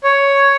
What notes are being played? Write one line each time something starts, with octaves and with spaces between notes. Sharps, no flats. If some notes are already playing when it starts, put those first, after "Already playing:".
C#5